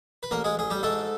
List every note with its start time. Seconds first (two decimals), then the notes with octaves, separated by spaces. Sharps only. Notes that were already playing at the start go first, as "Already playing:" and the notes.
0.23 B4
0.31 A1 A#3 A#4
0.44 G#3 G#4
0.57 A1 G#4
0.70 G3 G4
0.83 G#2 A3 A4